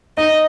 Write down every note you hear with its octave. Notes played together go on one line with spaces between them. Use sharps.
D#4 D#5